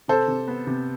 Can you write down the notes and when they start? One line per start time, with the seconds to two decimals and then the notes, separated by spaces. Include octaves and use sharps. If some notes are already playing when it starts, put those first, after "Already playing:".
0.08 C3 A4 C5
0.28 C3
0.48 B3
0.67 C3